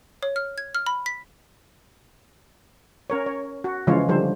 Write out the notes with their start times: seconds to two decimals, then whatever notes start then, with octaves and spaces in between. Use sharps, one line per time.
0.23 C#5
0.36 F6
0.58 G#6
0.75 F6
0.86 B5
1.06 B6
3.10 C#4 A#4 C#5
3.26 C#5
3.64 F#4
3.87 C#3 E3 F3 G#3 F4 C#5
4.09 D3 F3 G3 C5